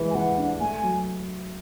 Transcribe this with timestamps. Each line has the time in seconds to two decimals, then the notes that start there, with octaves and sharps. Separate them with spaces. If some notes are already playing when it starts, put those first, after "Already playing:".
Already playing: E3 G#3
0.10 G#5
0.15 E3 F#5
0.38 D4
0.60 A3 G#5
0.83 F#3